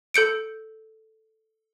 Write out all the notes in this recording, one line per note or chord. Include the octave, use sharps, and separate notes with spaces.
A4 G6 C#7 D7